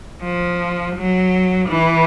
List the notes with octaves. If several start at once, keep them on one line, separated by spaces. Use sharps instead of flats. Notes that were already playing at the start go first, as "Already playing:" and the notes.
F3
F#3
E3